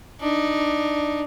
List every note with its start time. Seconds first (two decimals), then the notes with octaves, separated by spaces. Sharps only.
0.20 D4 D#4